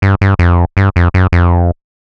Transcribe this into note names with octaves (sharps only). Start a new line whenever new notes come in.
G2
G2
F2
G2
F2
F#2
F2